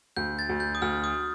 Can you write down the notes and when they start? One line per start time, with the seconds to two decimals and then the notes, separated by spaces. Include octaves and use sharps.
0.17 D2 G6
0.39 A6
0.49 D2
0.60 G6
0.75 D#6
0.82 D2 F6
1.04 D#6